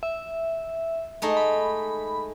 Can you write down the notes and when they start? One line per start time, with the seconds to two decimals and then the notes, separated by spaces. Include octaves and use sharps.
0.03 E5
1.22 G#3 A3 D#4
1.37 B5